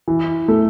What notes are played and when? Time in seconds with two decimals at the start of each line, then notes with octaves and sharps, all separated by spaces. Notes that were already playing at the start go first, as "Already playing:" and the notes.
0.08 E3
0.48 A3